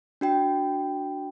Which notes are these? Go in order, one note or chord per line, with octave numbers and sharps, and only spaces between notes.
D4 F#4 G5